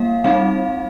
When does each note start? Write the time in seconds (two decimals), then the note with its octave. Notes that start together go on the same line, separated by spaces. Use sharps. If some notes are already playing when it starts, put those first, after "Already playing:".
Already playing: G3 A#3 F5
0.24 G3 C4 D#4 F5